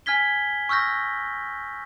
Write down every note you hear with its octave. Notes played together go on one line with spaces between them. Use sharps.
G#5 F6 G#6 B6 G7
C#6 E6 F6 G6 A#6